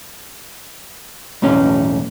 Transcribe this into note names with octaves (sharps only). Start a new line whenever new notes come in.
B1 E2 A2 C#4